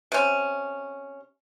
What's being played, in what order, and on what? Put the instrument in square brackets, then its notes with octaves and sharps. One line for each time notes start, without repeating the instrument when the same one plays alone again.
[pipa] C3 C#4